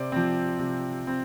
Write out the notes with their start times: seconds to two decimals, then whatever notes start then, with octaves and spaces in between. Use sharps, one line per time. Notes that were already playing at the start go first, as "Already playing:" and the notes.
Already playing: C3 C5 D5
0.12 F3 C4
0.59 C3
1.07 C4